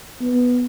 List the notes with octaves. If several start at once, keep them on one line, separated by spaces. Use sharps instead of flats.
B3